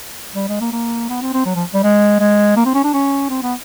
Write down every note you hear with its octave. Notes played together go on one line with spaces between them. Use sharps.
G3
G#3
A#3
A#3
B3
C4
C4
F#3
F3
G3
G#3
G#3
A#3
C4
C#4
D4
C#4
C4
B3